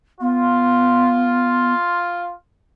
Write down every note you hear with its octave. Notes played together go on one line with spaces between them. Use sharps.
B3 F4